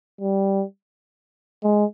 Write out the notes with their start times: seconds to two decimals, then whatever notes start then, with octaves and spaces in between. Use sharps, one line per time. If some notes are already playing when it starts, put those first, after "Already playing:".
0.21 G3
1.64 G#3